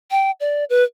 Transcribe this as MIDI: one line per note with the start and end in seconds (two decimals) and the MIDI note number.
0.11 0.31 79
0.40 0.64 74
0.70 0.84 71